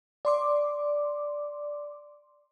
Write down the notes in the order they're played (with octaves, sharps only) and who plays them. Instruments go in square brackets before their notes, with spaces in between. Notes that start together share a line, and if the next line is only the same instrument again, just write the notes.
[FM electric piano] D5 C6 D6